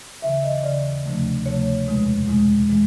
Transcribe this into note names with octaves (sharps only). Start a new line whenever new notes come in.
D#2 C#3 E3 E5
D#5
D#2 C#3 E3 D5
D2 C3 F3 A3
D2 C3 F3 A3 C#5
E2 B2 G#3
E2 B2 G#3
E3 G#3